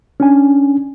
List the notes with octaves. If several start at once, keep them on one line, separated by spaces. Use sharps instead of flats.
C#4 D4 G#5